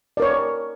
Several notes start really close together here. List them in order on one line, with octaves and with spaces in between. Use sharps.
D5 A#4 C#5